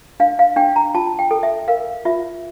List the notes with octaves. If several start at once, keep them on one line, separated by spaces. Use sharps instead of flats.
D4 F5
F5
D4 G5
A#5
F4 A5
G5
A4
E5
A#4 F5
F4 E5